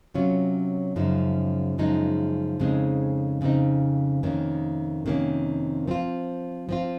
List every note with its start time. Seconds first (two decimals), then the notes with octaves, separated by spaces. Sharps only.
0.14 C3 F#3 C#4 F4
0.96 F#2 C#3 F3 G#3 D#4
1.78 F#2 C#3 F3 G#3 D#4
2.60 F2 C#3 G#3 C4 D#4
3.41 F2 C#3 G#3 C4 D#4
4.23 F2 C3 D#3 A#3 C#4
5.06 F2 C3 D#3 A#3 C#4
5.88 F3 C4 F4
6.69 F3 C4 F4